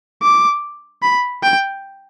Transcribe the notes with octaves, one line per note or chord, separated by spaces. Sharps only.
D6
B5
G5